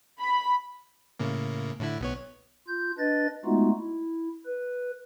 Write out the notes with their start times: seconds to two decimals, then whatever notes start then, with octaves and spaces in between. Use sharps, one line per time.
0.20 B5
1.20 A2 C#3 A#3
1.80 A2 D3 E4
2.01 B1 B3 C#5
2.68 F4 G6
2.98 D4 B4 D#5 A6
3.45 G#3 A3 B3 D#4 F4 F#4
3.80 E4
4.46 B4